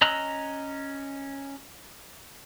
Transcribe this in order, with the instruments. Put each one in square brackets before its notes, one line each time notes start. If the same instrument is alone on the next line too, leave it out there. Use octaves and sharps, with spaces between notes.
[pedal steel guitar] C#4 D#5 A#5 E6 F#6